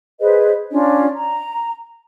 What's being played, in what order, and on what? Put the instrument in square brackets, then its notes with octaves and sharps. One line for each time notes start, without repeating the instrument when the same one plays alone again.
[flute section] G#4 B4 C5 D#5
C#4 D4 F4 C#5
A#5